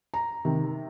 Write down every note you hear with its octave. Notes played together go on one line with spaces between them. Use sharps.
A#5
C3 D#3